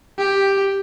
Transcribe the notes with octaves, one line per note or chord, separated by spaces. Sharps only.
G4